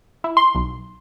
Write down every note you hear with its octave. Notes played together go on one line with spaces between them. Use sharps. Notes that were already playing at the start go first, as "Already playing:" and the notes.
E4
C6
B1